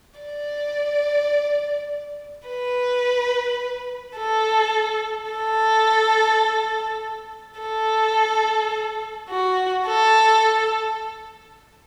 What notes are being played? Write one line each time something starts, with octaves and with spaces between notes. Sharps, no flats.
D5
B4
A4
A4
A4
F#4
A4